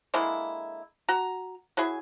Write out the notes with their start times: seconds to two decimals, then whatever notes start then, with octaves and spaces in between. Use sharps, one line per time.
0.14 D3 G#3 A#3 E4
1.09 F#4 A#5
1.77 F#3 E4 G#4 G#5